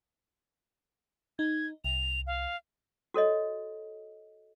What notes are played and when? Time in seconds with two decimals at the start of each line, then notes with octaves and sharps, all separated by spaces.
1.39 D#4 G#6
1.84 C2 F7
2.27 F5
3.14 F#4 A4 C#5 D#5